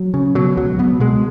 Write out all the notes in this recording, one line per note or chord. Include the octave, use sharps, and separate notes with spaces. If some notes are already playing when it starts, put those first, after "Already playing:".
Already playing: F#3
C#3
B2 F#3
C#2 F#3
B2 B3
B2 G#3